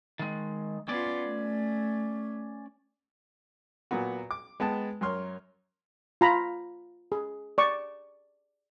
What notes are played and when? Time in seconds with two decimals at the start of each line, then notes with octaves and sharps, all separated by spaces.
0.19 D#3 G#3
0.88 B3 C#4 F4 D5
1.26 A3
3.91 A#2 F#3 B3 F#4
4.31 D6
4.60 G#3 B3 G5 A5
5.01 F#2 A#4 C#5 C6 F6
6.21 F4 A#5 B5
7.12 G#4
7.58 D5 C#6